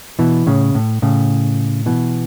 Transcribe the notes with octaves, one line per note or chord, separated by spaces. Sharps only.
B2 E3
A2 C#3
A2
A2 C#3
B2 E3